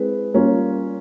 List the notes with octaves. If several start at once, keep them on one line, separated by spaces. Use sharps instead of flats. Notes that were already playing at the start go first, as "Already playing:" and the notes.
Already playing: G#3 C4 E4 G#4 B4
G3 A#3 C#4 F4